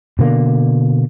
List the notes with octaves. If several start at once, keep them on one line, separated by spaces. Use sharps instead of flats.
B2 D3 A#3